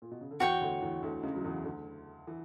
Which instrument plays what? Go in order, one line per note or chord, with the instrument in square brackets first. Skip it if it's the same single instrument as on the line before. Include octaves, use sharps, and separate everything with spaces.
[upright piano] A#2
B2
C#3
D3
[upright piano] E2 E3 [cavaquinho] F#4 C#5 G5 C#6
[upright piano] D2 D3
E2 E3
D2 D3
C#2 C#3
F#3
E2 E3
D2 D3
E3